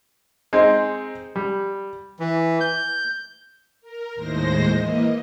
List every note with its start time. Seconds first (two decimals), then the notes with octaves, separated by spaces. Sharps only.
0.53 G#3 C4 D#4
1.36 G3
2.20 E3
2.60 G6
3.81 A#4
4.15 D#2 A2 G#3 C5 A#6
4.73 E3 A#3 D#5